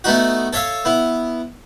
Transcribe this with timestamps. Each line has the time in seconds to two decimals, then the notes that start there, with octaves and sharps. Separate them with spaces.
0.04 A3 B3 D#4 F#4
0.53 A4 C#5 E5 F5
0.85 B3 E4